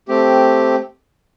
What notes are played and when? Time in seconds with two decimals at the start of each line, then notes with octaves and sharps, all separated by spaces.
0.08 A3 C4 G4